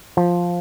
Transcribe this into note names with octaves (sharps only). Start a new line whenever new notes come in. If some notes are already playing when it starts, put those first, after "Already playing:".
F3